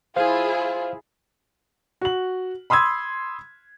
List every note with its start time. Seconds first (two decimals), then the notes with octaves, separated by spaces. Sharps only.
0.16 E4 F4 G#4 C5 F5
2.01 F#4 F#7
2.70 B5 C6 D#6 E6 G#6